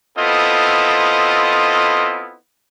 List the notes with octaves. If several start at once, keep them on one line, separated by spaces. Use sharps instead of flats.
B3 C4 E4 F4 A4 D#5